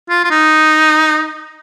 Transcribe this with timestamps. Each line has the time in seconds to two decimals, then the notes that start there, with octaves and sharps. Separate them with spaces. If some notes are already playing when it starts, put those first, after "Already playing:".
0.10 F4
0.24 F4
0.31 D#4